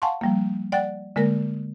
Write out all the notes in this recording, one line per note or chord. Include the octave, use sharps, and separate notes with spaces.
F5 F#5 G#5 A5 C6 C#6
F3 G3 A#3
D5 F#5 G5 F#6 A6
D3 G#3 A#3 A#4 A#6